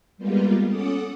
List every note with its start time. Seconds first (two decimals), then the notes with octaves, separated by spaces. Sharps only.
0.18 G3 G#3 A#3 B3 F4
0.69 C#4 A4 F#5 D6 D#6